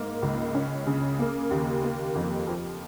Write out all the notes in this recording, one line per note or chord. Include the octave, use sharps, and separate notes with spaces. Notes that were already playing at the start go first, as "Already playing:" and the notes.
Already playing: G#2 A#3
C#2
C#4
C#3
A#3
D#2
A#3
F2
F3